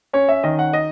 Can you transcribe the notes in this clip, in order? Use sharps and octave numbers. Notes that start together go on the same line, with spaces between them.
C#4 C#5
E5
D#3 D#5
F#5
D#5